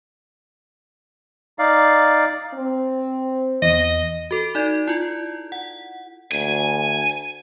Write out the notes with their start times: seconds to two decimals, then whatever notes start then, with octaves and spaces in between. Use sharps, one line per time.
1.59 D#4 D5 F5
2.54 C4
3.62 E2 D#5
4.31 F#4 A4 D7
4.55 D#4 D5 G6 G#6
4.88 E4 F4
5.52 F#5
6.32 D2 G#5